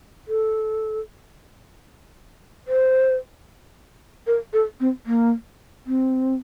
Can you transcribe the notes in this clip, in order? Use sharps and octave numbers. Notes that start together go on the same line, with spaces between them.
A4
C5
A#4
A4
C4
A#3
C4